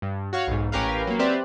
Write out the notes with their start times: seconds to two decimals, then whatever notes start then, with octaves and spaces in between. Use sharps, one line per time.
0.02 G2
0.33 F#4 C#5 F5
0.47 B1 G#2
0.72 A1 C#4 G4 A#4 B4 F5
1.07 F#3 A#3
1.19 C4 G4 B4 C5 D5 E5